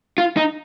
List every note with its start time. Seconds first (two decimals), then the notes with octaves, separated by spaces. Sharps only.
0.18 F4
0.37 D#4